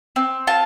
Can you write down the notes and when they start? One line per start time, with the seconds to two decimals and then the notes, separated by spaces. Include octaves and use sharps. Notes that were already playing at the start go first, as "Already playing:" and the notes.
0.16 C4
0.47 F4 A5